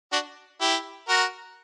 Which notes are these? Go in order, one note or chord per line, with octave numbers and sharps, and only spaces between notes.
D4 F#4
E4 G4
F#4 A#4